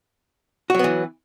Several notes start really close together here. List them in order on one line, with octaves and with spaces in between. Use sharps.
F#4 F#3 B3 E3